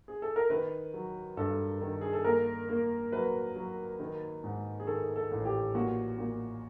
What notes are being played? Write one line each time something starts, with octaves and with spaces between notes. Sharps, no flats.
G#4
A4
A#4
D#3 B4
F#3
G2 A4
D#3
G#4
A4
A#3 A#4
A#3
F#3 B4
F#3
D#3
G#2
G#4
D#3 A4
A4
A1
G4
A#2 F#4
A#2